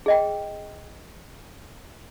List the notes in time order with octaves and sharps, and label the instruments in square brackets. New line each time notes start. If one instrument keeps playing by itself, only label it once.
[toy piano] G#4 D#5 G5